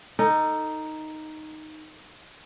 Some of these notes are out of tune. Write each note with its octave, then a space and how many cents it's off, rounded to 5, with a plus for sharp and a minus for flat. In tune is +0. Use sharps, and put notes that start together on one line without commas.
D#4 +0 A4 +30